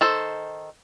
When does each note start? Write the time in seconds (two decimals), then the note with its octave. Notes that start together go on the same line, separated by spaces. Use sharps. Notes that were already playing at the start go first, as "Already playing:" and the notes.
0.01 D#3 A4 C5